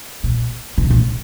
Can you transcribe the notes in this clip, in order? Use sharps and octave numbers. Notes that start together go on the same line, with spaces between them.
A#2
C3
A#2